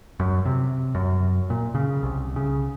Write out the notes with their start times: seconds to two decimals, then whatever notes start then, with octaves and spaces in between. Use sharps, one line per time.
0.20 F#2
0.45 C3
0.95 F#2
1.50 A#2
1.75 C#3
2.03 C2
2.36 C#3